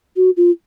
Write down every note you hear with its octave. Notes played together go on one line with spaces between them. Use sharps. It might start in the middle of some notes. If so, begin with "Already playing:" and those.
F#4
F4